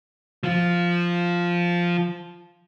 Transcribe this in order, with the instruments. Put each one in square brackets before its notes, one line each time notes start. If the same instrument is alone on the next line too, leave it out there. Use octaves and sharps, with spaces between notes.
[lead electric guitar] F3 F4